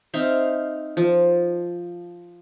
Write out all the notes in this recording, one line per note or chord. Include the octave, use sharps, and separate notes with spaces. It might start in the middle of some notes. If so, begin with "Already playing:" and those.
C4 D#4 E5 F5
F3